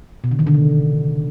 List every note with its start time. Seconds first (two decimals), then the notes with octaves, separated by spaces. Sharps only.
0.24 B2
0.31 D3
0.39 D#3
0.47 D3
0.54 C#3